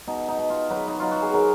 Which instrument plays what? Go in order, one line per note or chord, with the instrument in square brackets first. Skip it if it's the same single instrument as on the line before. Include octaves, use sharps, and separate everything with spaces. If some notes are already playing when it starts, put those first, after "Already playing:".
[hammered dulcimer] B2 D#4
D#4
B2
F4
F#3 B4
D#4
F#3 F4
F#4
G#4
F#3 A#4